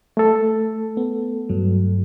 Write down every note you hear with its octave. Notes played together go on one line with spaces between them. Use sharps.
A3 A4
B3
G2 F#3